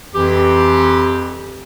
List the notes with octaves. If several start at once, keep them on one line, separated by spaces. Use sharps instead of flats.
F2 E3 G4